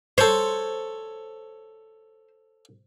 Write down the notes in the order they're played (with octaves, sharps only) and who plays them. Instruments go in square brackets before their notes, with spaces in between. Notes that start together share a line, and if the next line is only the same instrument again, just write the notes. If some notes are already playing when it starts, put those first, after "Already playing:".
[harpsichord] A4 C#5 [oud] C5